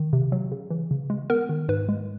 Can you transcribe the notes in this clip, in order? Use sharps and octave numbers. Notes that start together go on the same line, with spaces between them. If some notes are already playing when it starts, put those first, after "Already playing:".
Already playing: D#3
C3
F#3
C#3
E3
C#3
G#3
B3 A#4
D#3
G#2 B4
G#3